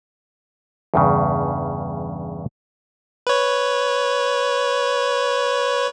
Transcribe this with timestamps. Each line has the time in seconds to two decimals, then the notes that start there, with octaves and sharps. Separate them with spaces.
0.94 E2 G2 C#3
3.27 B4 C#5